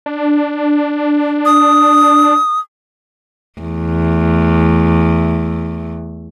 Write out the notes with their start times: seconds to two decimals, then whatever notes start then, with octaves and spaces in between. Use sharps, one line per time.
0.06 D4
1.45 D#6
3.61 E2 A3